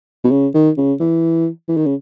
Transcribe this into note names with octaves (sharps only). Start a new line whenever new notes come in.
B2
C#3
D#3
C#3
E3
E3
D#3
C#3